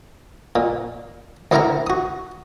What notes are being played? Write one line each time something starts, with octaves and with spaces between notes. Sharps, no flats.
A#2
D2 B3 E4 A#4 G5 A#5
F#4 D#6